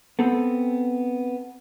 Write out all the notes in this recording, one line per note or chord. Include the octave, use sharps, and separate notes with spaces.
B3 C4 A4